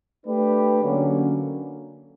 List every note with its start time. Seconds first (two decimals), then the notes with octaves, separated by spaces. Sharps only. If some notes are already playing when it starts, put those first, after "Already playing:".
0.25 A3 D4 G4 B4
0.82 D3 F#3 A#3 C#4